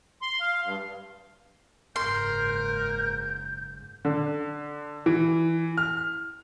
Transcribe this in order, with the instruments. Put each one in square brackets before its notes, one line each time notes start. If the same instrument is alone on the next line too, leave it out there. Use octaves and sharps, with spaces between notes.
[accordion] C6
F5
G2
[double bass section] F#1 G#2 [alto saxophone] A#4 [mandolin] C6 [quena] G6
[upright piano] D3
E3
F6